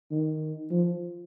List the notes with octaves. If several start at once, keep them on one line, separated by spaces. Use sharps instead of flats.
D#3
F3